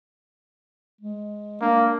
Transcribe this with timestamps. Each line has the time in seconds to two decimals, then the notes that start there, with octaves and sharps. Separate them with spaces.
1.01 G#3
1.61 A#3 D4